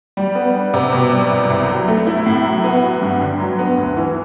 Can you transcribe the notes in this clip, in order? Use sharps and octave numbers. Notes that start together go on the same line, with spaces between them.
G3
B3
D4
C3
B2
G3
C2
C2
F#3
A3
E4
A2
F#3
B3
F#4
G2
D3
F#3
B3
D2
E3